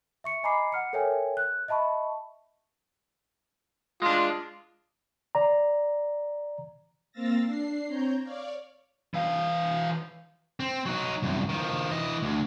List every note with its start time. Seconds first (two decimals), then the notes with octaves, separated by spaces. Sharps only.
0.24 E5 C#6 C#7
0.43 D#5 G#5 A#5 B5 D6 C7
0.72 F#5 F6 C#7
0.93 A4 A#4 C#5 E5 G5 G#5
1.37 F#6
1.68 D#5 E5 A5 B5 C#6
4.02 G#3 D4 F4
5.35 D5 A#5
7.12 A#3 C4 F5 E6 A6 A#6
7.45 D4 C7
7.87 C4 C#5 A#5 G6
8.23 C#5 D5 F5
9.14 E3 F5
10.60 C4
10.86 F#3 D#4
11.23 C2 F#2
11.49 D#3 F3
11.91 E3 D#5
12.23 D2